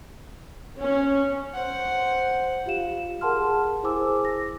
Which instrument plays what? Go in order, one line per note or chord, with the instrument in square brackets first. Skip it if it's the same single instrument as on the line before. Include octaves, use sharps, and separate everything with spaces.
[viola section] C#4
[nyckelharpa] C5 F#5
[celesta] F4 G4 F5 E7
G#4 A#4 F#5 A5 C6 F6
E4 G#4 C5 G#5 D6 E6
A#6